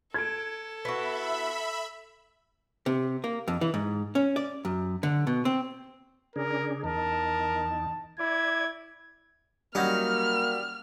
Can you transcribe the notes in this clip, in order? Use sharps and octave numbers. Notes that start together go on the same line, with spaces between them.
A4 G#6 D7
B3 E4 F#4 E5 B5
C3
A#3
F2
E3
G#2
C#4
D5
F#2
D3
B2
C4
C#3 D4 G#4 A#4
E2 D#4 A#4 A5
E4 D5 G#6
F#3 G3 A#3 C#4 D#4 F6